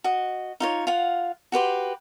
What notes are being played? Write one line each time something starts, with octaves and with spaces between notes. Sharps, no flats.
F#4 D#5
D#4 F4 C#5
F4 F5 F#5
F#4 G4 B4 C6